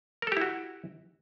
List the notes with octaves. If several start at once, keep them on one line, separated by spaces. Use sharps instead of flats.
E4 F#4 G4 A4 A#4